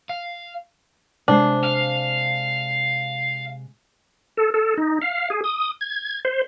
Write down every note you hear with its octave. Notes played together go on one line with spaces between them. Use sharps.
F5
C3 G#3 D4 C5
F5
A4
A4
D#4
F5
G#4
D#6
G#6
C5